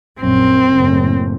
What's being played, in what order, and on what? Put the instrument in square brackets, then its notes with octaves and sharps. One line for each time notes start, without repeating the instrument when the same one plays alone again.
[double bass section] A#1 F#2 [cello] C4
[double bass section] F#1 A2